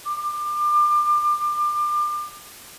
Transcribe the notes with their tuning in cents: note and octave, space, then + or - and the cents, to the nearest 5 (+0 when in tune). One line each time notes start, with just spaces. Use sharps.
D6 +30